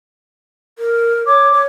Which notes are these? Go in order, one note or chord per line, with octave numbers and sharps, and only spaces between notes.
A#4
C#5 D6
C#5